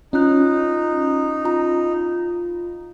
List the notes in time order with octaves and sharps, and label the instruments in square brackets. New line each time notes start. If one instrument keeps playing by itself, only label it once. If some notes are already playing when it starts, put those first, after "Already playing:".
[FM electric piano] C#4 [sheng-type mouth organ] D#4 [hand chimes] F4 F#6
[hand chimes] F4 A#5